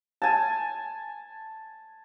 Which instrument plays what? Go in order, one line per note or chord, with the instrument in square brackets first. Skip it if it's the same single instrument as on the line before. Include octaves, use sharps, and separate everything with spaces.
[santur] G#5 A5